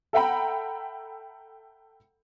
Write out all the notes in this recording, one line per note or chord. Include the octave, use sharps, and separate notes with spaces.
A4 E5 F#5 G5 A#5 B5